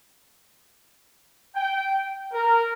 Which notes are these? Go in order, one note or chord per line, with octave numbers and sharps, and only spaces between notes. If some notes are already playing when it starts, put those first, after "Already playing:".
G5
A#4